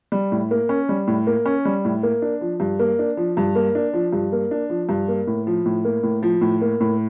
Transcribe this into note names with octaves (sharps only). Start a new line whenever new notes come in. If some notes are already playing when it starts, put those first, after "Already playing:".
G3
A2
A#3
C#4
G3
A2
A#3
C#4
G3
A2
A#3
D4
F3
G2
A#3
D4
F3
G2
A#3
D4
F3
G2
A#3
D4
F3
G2
A#3
A2
F3
A2
A#3
A2
F3
A2
A#3
A2